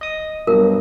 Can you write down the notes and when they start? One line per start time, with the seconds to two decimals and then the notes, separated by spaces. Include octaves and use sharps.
0.01 D#5 D#6
0.47 G2 B2 F#3 A#4